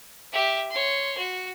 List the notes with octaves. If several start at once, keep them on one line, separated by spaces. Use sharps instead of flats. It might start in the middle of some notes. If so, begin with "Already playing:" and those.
G4 E5
C#5 C6
F#4